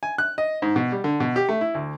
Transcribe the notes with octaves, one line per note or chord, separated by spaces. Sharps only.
G#5
F#6
D#5
G#2
B2
G3
D3
B2
G4
A3
E4
D2